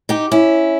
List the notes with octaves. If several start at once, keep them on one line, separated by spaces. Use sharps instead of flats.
D#4 G4
C#4 E4